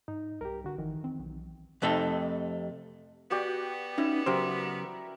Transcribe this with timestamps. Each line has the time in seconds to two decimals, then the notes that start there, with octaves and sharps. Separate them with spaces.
0.08 G#2 D#4
0.41 C2 G4 A#4
0.64 D3 F#4
0.78 G#1 F2 D#3 E3
1.04 C4
1.19 B1
1.82 F2 C3 A3 D#4 A4
3.31 B3 F#4 G4 D5
3.98 C#4 D#4 E4
4.26 C#3 F#3 G4 A#4 C5 E5